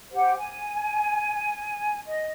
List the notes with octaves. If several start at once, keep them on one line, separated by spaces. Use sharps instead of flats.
G4 C5 F#5
G#5
D#5